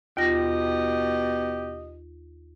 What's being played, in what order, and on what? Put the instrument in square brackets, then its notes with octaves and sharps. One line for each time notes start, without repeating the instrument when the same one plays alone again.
[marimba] D#2 F4 A#6 [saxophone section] B2 G4 D#5